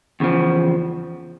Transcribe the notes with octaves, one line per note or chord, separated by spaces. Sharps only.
E2 C#3 F3